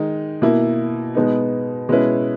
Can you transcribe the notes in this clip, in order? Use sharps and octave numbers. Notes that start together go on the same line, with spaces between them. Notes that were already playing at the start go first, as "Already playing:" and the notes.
Already playing: D#3 G#3 D#4
B2 A#3 E4
B2 G#3 B3 D#4
B2 G#3 C#4 E4 B4